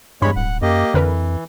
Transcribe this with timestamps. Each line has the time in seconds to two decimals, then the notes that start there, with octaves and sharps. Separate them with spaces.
0.22 E2 G2 G#3 C#5 B5
0.36 D1 F#5
0.62 F#2 A#3 G4 D#5
0.94 F2 D3 E3 A#4 B4